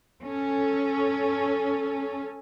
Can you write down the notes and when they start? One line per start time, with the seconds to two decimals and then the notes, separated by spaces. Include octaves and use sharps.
0.24 C#4 A4